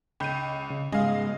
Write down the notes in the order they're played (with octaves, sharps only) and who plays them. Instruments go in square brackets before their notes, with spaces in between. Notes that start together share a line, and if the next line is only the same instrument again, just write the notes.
[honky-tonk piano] C#2 D#7 [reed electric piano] G5 B5 G6
[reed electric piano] C#3
[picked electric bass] G#2 C#3 [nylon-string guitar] G#3 [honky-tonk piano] D#5 F5 [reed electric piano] G#5